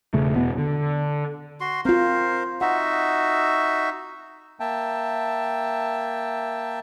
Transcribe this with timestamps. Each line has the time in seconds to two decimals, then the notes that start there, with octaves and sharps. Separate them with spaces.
0.14 E1 C#3 A3
0.36 E2 B2 B3
0.58 D3
1.61 F#4 C6
1.85 C4 F4 A#4 C5 F5
2.61 D#4 F#4 E5 F#5
4.60 A#3 E5 G5 A5